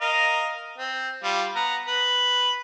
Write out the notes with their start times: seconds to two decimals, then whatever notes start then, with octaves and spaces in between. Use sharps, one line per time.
0.01 A#4 D#5 F5
0.78 C4
1.23 G3 F4
1.56 B3 A#5
1.88 B4